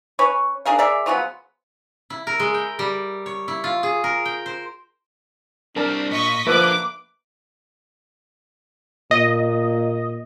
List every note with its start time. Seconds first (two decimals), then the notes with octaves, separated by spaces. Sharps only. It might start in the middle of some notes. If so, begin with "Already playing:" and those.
0.19 C#4 B4 C#5
0.66 D4 G#4 A#4 F5
0.79 G#4 A#4 D5 E5
1.06 C#3 F3 F#3 B3
2.10 E4
2.27 A#4
2.40 G#3
2.54 G5
2.79 G3
3.26 C#5
3.48 E4
3.64 F4
3.83 G#4
4.04 A#4
4.25 G5
4.46 C5
5.76 G3 C4 D4 A#4 A5
6.11 A#2 D#5 C#6 B6
6.47 F3 A#3 D4 A4 B4 E5 D6
9.11 A#2 D#5